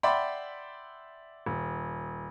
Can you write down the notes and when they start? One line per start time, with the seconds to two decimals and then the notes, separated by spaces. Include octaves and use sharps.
0.03 D5 E5 F#5 G5 B5 C6
1.46 D#1